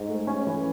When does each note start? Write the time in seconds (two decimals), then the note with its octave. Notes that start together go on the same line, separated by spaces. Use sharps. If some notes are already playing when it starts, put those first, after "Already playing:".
Already playing: G#2
0.09 A3
0.27 C#4
0.47 E3